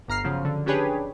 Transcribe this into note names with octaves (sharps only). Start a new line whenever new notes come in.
G1 A#5 F6 C7
C#3 F3 F#3
D3
C#4 D4 G4 G#4 B4 C#5